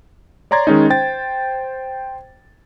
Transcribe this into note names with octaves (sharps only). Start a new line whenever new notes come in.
C#5 D5 A#5 C6 G#6 A6
D#3 G#3 C#4 D#4
C5 G5 A6